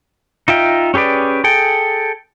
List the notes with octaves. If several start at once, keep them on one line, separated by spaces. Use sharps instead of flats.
D#4 F4 E5 G5
C#4 G4 G#4 B4 D5
G#4 A4 G5